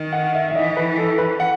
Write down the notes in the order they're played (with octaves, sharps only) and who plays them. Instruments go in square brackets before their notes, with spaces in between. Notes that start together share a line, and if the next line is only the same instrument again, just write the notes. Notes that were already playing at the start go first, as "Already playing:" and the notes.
Already playing: [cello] D#3
[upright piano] F#5
E5
E5
[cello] E3 [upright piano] D#5
[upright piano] B4
A4
B4
F#5